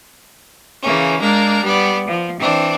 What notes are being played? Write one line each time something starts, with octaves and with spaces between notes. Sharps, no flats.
C#3 E3 A#3 C#4
G#3 A#3 D4 A#4
G3 B3 D5
F3
E3 C4 D4